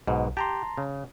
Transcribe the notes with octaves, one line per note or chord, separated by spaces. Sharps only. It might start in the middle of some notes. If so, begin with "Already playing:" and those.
B1 G#2 B2
G4 A5 A#5 C6
C#3